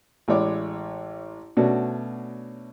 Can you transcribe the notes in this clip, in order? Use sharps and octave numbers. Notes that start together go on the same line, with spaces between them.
A1 G#3 E4 C#5 D5 D6
B2 A3 C#4 D4 F#4